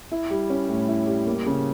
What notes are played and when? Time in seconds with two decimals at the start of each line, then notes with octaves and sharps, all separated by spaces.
0.11 E4
0.30 G3
0.50 C#4
0.68 A2
0.88 E4
1.07 G3
1.27 A#3
1.46 C#3